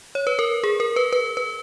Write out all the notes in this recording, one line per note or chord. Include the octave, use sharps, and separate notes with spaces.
C#5
B4
A#4
G#4
A#4
B4
B4
B4